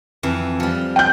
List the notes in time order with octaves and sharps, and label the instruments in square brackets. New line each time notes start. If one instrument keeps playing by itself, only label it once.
[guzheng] F2 E3
F3 G3
[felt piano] G5 G6